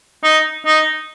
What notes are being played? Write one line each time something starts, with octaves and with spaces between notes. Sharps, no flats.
D#4
D#4